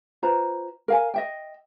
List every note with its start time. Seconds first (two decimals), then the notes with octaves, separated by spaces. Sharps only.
0.23 F4 B4 C5 A#5
0.88 A#4 F5 G#5
1.14 D#5 E5 G5